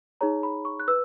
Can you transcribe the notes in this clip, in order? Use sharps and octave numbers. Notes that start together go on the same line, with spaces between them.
D#4 G#4 C#5 A#5
B5
C#6
F#6
B4 E6